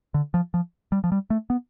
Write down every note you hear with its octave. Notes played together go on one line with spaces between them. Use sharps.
D3
F3
F3
G3
F3
G3
A3
B3